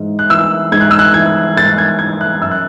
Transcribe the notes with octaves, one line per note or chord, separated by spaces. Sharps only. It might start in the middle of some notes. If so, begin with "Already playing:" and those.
Already playing: G#2 E3
F#6
E3 E6
G#2 G#6
F#6
E6
F#6
E3 G#6
G#2 A6
G#6
E3 G#6
F#6
F#2 E6
F#6